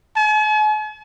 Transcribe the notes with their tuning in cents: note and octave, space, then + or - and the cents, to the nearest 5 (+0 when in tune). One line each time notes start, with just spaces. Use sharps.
G#5 +45